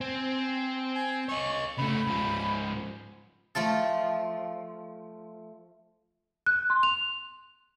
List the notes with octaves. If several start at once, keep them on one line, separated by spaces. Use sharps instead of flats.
C4 G#5
G#5
C#5 D#5 C#6
C#3 A3 B5
G#2 F3
F3 A3 F4 A4
F#6
C6
F7